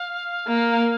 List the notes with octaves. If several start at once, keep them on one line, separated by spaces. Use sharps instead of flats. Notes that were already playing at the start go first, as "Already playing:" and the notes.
Already playing: F5
A#3